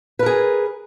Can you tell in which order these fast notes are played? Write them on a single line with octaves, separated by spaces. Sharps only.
B4 A#4 G#4